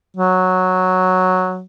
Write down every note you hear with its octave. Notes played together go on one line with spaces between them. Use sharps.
F#3